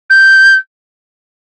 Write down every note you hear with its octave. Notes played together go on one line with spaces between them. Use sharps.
G6